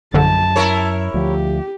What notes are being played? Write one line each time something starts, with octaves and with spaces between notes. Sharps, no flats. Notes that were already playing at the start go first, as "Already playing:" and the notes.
A#1 F#2 D3 A5
E4 A#4 C#5
D2 F3 G4